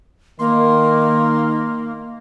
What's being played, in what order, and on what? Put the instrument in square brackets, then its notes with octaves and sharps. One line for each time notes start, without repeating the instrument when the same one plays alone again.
[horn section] D#3 [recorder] A#3 [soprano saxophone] C6